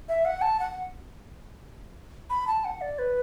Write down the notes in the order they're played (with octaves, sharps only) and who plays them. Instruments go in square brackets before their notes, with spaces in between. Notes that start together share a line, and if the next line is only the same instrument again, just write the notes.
[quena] E5
F#5
A5
F#5
B5
A5
F#5
D5
B4